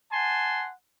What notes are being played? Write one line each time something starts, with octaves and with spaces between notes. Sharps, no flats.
F#5 G#5 A5 C6